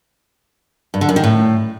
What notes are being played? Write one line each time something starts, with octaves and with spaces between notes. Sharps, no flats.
G2
D3
F#2
D#3
A2